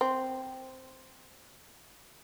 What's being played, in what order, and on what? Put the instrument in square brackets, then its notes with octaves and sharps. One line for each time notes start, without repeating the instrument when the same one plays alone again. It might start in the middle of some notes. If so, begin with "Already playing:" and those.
[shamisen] C4